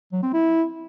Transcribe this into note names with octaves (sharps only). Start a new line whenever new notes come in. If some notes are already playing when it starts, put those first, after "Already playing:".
F#3
C4
E4